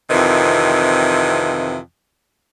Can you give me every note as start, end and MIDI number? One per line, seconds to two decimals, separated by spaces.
0.10 1.78 41
0.10 1.78 48
0.10 1.78 51
0.10 1.78 52